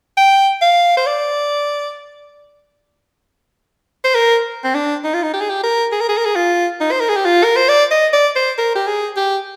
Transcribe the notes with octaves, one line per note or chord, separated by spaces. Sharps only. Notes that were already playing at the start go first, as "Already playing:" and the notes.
G5
F5
C5
D5
C5
A#4
C4
D4
D#4
F4
D#4
G4
G#4
G4
A#4
G#4
A#4
G#4
A#4
G#4
F4
D#4
C5
A#4
G#4
G4
F4
A#4
C5
D5
D#5
D5
C5
A#4
G4
G#4
G4